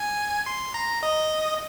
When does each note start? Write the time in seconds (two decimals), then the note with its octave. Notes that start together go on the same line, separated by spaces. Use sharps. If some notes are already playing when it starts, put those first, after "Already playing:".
Already playing: G#5
0.46 C6
0.74 A#5
1.03 D#5